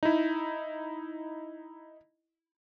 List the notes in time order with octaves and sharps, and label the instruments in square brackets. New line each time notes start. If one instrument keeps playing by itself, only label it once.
[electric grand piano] D#4 E4